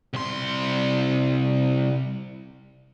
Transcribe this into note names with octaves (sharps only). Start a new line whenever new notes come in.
C2 C6